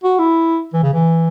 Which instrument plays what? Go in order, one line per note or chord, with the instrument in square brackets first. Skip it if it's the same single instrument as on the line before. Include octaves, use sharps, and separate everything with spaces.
[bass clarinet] F#4
E4
E3
C#3
E3